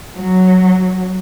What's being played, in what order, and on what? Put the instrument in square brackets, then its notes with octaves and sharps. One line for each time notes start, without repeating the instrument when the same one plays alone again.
[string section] F#3